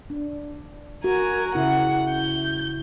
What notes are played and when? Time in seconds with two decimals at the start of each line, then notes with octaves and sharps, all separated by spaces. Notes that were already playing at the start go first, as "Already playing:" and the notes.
0.10 D4
1.04 F#4 A#4 G#5
1.55 C#3 E4 F#5
2.10 G6